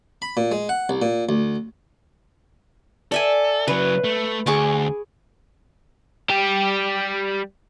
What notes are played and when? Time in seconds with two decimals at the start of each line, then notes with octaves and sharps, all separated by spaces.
0.22 B5
0.37 A#2
0.52 G#3
0.69 F#5
0.89 C2
1.02 A#2
1.29 D2
3.12 A4 D5 E5 G#5
3.68 C#3 F#3 B4
4.04 A3
4.46 D2 G#4 C#6 D6
6.30 G3 G4